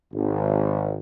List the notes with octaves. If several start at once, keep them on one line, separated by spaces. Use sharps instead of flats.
G#1